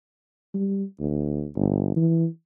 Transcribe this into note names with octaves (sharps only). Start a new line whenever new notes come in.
G3
D2
G1
E3